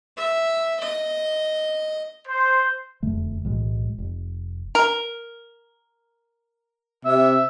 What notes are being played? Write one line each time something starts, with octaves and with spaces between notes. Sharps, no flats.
E5
D#5
C5
E1 F2 D3 A3
B1 A2 E3 G#3
F1
A#4
C3 E5